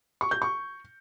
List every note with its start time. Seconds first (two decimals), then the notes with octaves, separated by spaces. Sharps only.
0.21 C#6
0.31 G6
0.42 C#6